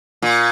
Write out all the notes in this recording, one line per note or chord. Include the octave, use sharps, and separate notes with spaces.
A#2